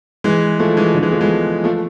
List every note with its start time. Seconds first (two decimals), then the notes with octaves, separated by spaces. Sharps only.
0.24 E3 G#3
0.59 F3 A3
0.77 E3 G#3
0.94 D3 F3
1.03 E3 G#3
1.12 F3 A3
1.20 G#3 B3
1.64 F3 A3